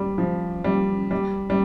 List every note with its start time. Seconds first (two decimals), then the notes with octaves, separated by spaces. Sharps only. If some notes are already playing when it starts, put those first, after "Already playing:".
Already playing: G3
0.18 F3
0.64 G3
1.11 G3
1.50 G3